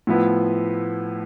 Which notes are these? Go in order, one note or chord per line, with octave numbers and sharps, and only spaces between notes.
A2 F3 B3 E4 B4